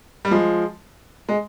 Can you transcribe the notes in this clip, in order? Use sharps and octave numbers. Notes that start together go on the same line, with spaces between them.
G3
F3 G#3
G#3